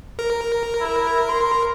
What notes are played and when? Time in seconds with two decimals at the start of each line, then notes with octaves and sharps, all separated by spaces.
0.19 A#4
0.80 E4
1.29 C6